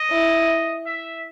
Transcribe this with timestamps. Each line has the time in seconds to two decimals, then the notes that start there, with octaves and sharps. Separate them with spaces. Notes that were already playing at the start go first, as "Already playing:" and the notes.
Already playing: D#5
0.11 E4
0.86 E5